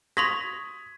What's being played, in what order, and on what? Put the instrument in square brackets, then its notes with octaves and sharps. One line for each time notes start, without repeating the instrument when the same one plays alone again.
[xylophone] C6 C#6 A#6 [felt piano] D#6 G#6 B6